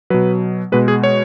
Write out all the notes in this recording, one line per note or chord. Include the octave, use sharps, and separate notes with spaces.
B2 F#3 B4
B2 G#3 B4
G#4
C#5